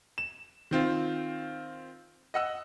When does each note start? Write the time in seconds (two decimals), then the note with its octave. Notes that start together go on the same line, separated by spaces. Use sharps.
0.18 E7
0.71 D#3 C4 F4
2.34 D#5 F#5 E6